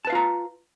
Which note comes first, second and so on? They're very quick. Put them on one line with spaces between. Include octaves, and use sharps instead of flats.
A5 B4 F5 F4 A#5